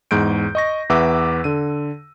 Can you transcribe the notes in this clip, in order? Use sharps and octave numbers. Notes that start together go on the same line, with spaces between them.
E2 G#2 G6 D7
D#5 C#6 A#6
E2 B4 E5 F#5 D6 E6
D3 D#7